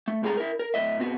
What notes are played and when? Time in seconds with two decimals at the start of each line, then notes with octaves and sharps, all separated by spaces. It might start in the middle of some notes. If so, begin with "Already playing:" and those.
0.08 A3
0.23 C2 A2 G#3 G#4 A5 A#5
0.37 E4 A#4
0.59 A#4
0.74 A2 D#5 E5
0.98 G#2 C3 B3 F#4